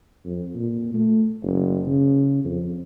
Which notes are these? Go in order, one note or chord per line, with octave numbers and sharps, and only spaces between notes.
F2
A#2
A3
F#1
C#3
F2